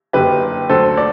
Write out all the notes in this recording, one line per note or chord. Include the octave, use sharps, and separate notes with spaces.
F#1 F#2 D3 G4 B4
D2 D3 F#3 A4 C5
D5